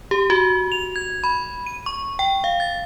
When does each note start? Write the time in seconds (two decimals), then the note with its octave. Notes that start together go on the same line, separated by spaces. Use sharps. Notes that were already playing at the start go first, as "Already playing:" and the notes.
0.11 G4
0.30 F#4
0.72 F7
0.96 G#6
1.24 B5
1.66 D#7
1.86 C#6
2.19 G5
2.44 F5
2.60 A6